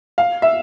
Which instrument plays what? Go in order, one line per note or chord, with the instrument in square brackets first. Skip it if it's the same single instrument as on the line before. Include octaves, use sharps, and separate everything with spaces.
[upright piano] F5
E5